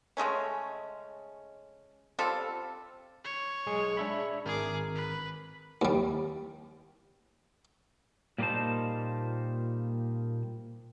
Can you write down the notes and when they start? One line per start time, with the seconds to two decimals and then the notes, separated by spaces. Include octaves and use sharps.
0.17 C#3 G#3 A3 C#4
2.19 G3 C4 F4 A4
3.24 C#5
3.66 B1 G#3 G#4
3.97 D4 E5 B5
4.45 G#1 G#4 A#4 D6
4.95 B4
5.82 D#2 G3
8.38 A#2 G3 A#3 D#4 C5 A5